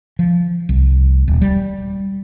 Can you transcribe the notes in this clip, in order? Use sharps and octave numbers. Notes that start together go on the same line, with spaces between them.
F3
C2
D#1
G3